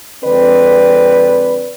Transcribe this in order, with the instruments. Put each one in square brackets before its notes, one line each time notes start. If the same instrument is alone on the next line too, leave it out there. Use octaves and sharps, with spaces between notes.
[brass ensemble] F2 D3 G#3 C4 B4 D5